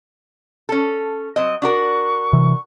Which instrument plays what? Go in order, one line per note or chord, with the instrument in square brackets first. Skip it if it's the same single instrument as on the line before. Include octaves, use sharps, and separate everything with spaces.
[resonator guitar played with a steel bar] C#4 A4
F#3 C4 D#5
[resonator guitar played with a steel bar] D4 F#4 A#4 [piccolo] C#6
[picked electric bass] C3 E3